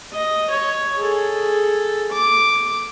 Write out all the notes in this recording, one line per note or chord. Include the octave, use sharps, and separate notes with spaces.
D#5
C#5
G#4 A4
D6